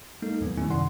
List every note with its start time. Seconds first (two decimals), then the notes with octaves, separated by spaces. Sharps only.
0.22 G#3 A#3 D#4 A4
0.41 D#2 A#2 F3 F#3 B3
0.57 D#3 G3 A3 C#4 E4 G#5
0.70 F#2 C3 D#3 D5 F#5 C6